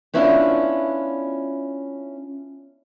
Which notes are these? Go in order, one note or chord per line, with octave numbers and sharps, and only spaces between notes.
B3 C#4 D4 E4 F4